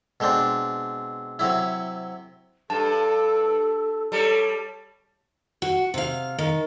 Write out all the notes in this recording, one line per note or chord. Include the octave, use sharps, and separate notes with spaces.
B2 G#3 C4 D4
C3 F#3 E4
G2 A4 A5
G3 A4 C#5
F#4
C3 F5
D#3